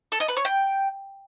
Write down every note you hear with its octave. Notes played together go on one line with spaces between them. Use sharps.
A4
D#5
B4
C#5
G5